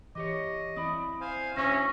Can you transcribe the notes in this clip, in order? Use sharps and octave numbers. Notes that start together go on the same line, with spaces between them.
E3 G4 C#5 D#5 D6
C4 E4 D5 B5 D#6
C5 F5 G#5
D2 C#4 E5 C#6 A#6